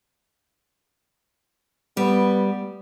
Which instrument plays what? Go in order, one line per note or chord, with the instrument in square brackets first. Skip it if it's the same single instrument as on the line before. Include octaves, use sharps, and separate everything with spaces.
[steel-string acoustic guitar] G3 [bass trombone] B3